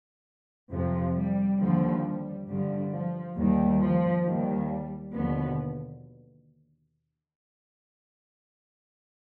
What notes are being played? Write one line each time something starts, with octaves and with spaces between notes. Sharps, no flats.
F2 C3 F3
G3
D#2 D3 F3 G3
G3
G2 D3 F3 G3
F3
D#2 D#3 G3
F3
D#2 D#3 G3
D#2 B2 D3 F3 B3